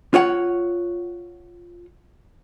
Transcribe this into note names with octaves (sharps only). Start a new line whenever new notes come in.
F4 C#5 F#5